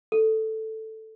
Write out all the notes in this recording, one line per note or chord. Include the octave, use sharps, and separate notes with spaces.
A4